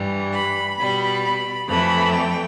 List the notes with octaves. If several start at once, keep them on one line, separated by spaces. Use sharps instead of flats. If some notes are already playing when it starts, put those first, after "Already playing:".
Already playing: G2 E3 G3
B5
B2 G3 B5
B5
F2 E3 A3 B5
G5